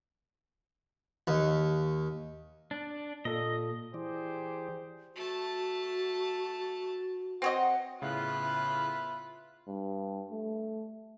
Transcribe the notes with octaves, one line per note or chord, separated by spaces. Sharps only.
D#2
D4
A#2 A4 D#5
E3 G4 G#4 C5 D5
A3 F#4 A5
C4 C#5 D#5 F#5
A2 C#3 B3 E4 F4 B5 F#6
G2
A3